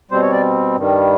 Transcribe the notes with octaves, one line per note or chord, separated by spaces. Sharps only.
B2 G3 C4 C5
C#5
D5
G2 D#3 G3